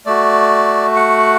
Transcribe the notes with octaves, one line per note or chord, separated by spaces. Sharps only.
A3 F#4 D5
F#5